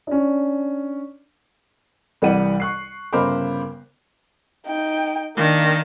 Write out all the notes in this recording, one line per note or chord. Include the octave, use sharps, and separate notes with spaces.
C#4 D4
C2 E3 G3 D5 F#5 D#7
C#6 F#6 C7
G1 C#3 A#4 C5 B5 D6
D#4 G5
D#3 A#3 D4